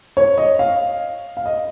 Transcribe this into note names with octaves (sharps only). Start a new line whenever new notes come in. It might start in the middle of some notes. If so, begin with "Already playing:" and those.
C#5
D#5
F5
F5
D#5